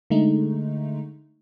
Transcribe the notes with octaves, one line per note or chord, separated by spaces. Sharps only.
D3 G#3 A3 D#4